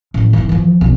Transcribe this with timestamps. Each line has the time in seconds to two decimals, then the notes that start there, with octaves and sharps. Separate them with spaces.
0.14 A1 E3
0.33 D#3 E4
0.49 E3 F3
0.81 B1 C#3